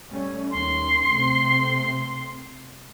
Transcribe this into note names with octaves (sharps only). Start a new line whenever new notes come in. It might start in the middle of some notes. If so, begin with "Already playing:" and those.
G3 A3 C#4
D#2 C#4 C6
C3 A3 C4